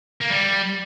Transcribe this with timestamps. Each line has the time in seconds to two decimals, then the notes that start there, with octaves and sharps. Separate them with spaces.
0.22 A#3
0.32 G3